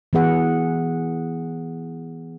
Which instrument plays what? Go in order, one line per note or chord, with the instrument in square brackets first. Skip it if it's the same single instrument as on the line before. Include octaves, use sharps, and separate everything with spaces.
[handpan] E3 B3 G#4 F#5